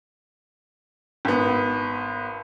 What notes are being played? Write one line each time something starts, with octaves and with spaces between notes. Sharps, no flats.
G#1 B3